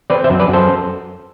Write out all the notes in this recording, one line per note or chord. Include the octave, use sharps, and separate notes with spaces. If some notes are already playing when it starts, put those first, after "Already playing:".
C4 B4 D5
C5 E5
F#2
B4 D5
F#2
A4 C5